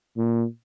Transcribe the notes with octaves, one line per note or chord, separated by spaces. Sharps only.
A#2